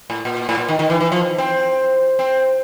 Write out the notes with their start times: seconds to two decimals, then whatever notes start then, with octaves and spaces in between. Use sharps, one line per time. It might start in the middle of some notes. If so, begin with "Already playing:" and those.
0.10 A2
0.25 A#2
0.49 A2
0.58 A#2
0.69 D#3
0.79 D#3
0.90 E3
1.01 E3
1.12 F3
1.38 C4
2.19 C4